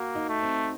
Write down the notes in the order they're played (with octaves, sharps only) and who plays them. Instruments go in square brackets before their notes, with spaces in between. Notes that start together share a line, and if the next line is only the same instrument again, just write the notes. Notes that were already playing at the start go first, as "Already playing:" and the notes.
Already playing: [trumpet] A#3 [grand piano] F#4
[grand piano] D#4
[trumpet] A3
[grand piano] C4